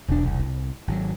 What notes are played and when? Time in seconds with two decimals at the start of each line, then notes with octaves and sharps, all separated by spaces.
0.08 E1 B1 E2 D4
0.24 C2
0.40 E4
0.87 G#1 C#3 F#3